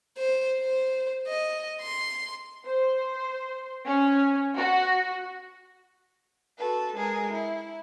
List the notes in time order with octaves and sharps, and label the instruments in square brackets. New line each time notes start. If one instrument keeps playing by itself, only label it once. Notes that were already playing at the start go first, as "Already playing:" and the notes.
[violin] C5
C5
D#5
C6
[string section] C5
C#4
F#4
[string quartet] F#4 A4 B4
G#3 G#4 A#4
E4